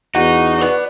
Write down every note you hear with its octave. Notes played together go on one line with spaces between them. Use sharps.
E2 D#4 F#4
B3 D4